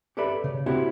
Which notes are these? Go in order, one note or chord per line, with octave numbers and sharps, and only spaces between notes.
G4 A4 B4 D5 E5 B5
C#3
C4 E4 F#4 G4 C#5